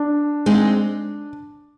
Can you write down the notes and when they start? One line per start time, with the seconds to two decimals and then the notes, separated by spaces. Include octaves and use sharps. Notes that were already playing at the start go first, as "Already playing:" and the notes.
Already playing: D4
0.46 G#3 C4 D#4 G#4